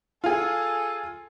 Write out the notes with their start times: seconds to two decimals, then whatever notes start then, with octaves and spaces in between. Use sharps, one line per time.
0.24 F4 G#4 A4